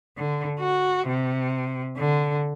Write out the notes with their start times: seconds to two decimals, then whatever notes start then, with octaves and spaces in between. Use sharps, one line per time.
0.17 D3
0.59 F#4
1.08 C3
1.97 D3